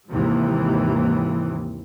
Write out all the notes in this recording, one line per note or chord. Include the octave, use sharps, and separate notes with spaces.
D#2 G#2 C3 E3